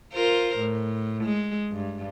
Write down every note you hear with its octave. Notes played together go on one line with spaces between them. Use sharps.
F4 A#4 C5
A2
G#3
G2